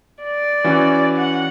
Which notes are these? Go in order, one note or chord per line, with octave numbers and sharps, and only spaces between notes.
D5
E3 C#4 F#4
F#5